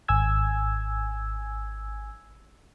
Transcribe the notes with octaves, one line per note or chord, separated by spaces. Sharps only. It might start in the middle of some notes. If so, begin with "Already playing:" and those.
G#1 G#5 E6 G#6